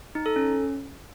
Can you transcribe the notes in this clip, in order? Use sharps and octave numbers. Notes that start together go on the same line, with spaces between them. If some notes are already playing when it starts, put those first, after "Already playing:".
D#4
A4
C#4